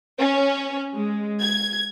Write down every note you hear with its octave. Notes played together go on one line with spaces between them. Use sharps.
C#4
G#3
G#6